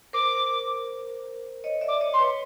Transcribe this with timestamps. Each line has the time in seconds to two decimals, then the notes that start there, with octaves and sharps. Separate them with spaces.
0.13 A#4 C5 D6
1.64 C#5 D#5
1.81 D5 E5
1.88 D6
2.01 C#5 D#5
2.13 C6
2.19 B4 C#5